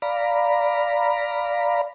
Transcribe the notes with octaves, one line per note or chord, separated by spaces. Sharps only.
D5 F5 A#5 B5